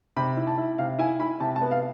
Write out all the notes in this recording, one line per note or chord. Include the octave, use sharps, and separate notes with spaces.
C3 B5
E4
A5
E4
C3 F5
E4 G#5
E4 B5
C3 A5
A5
B3
F5